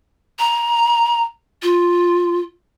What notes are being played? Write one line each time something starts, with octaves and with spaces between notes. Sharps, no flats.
A#5
F4